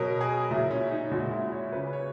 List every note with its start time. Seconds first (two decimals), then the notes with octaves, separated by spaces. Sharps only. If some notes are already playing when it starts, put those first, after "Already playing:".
Already playing: B2 F#3 A#4
0.21 G#4
0.51 A#2 F#3 E4
0.71 C#4
0.91 D#4
1.11 A#2 G#3 F#4
1.31 E4
1.52 C#5
1.73 C#3 F#3 B4
1.93 C#5